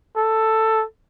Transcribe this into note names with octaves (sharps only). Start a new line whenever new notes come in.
A4